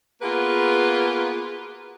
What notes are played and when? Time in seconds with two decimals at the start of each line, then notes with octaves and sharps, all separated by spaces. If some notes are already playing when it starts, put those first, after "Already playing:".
0.22 A#3 B3 F4 F#4 G#4 B4